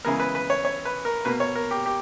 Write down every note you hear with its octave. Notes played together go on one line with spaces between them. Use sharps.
C#3 E3 G#3 B3 A#4
B4
B4
C#5
C#5
B4
A#4
B2 A#3 B4
C#5
A#4
G4
G4